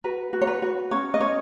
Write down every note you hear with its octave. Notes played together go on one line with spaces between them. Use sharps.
F#4 B4
F#4
C#5
B4
F#4
C#4 C#5
D#5
C#4 C#5